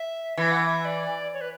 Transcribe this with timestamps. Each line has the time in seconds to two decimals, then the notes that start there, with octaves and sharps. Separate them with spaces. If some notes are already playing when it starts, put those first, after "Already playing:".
Already playing: E5
0.37 E3 E5
0.51 F#5
0.66 E5
0.85 D5
1.33 C#5
1.41 B4